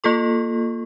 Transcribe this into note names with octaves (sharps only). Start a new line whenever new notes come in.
A#3 F4 A4 C#6